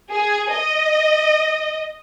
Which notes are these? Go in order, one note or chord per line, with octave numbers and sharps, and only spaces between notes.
G#4
D#5